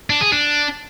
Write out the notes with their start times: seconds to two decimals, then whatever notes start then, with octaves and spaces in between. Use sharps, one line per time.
0.10 D4
0.21 G#4
0.32 D4